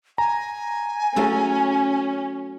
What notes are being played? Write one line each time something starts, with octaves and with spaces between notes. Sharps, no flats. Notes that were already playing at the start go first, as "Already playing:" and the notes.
G#5 A#5
F#3 A3 C#4 E4